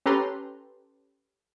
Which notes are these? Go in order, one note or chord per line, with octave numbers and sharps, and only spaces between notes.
C#4 G4 A4 B4 A#5 C6